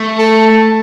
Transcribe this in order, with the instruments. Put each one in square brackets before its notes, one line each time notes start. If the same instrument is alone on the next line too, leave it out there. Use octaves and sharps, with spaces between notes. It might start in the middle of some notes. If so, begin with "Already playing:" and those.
Already playing: [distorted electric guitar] A3
[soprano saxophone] A4